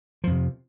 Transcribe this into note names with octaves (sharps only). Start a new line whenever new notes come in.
F2 C3 F3